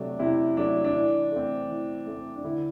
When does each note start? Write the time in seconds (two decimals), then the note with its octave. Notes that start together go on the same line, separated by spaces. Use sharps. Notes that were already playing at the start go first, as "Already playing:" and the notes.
Already playing: C3 F#3 A3 D4
0.19 C3 E4
0.57 F#3 A3 D4
0.84 D4
0.94 E3
1.31 A3 C4
1.69 E3
2.07 A3 C4
2.36 D4
2.44 D3 E4